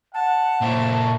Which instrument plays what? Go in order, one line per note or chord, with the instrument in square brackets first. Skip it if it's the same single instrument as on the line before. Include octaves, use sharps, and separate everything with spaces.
[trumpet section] F#5 [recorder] A5
[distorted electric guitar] A#2 E4 [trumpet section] F4 C5 C#5